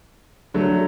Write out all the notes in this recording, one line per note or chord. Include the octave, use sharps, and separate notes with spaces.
D3 F#3 A3